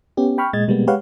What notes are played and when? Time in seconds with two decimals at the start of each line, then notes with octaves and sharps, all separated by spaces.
0.17 B3 C#4 G4
0.38 G5 B5 C#6 F6
0.53 A#2 G#3 D#5 G#6 A6
0.68 B2 G3 G#3 A#3 B3
0.87 G#3 G4 B4 C#5 F5 F#5